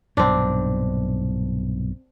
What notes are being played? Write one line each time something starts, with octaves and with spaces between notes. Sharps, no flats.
B1 G2 A#2 C4 D4